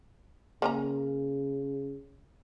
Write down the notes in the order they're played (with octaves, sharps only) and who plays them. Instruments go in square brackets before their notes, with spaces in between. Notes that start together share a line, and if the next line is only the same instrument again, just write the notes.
[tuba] C#3 [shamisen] A#3 C#4 A#5